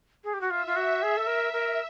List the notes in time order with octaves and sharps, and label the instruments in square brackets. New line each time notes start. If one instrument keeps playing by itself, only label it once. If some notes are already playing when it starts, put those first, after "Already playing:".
[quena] G#4
G4
F#4
[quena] F4 [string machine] E5
[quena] F4
F#4
G#4
A4
A#4
[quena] A#4 [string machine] E5